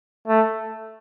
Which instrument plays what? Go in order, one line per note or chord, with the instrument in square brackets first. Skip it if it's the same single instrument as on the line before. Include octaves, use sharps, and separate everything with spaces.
[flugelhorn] A3